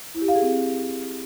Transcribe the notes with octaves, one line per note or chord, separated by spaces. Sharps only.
E4
G4
F5
G#4
C4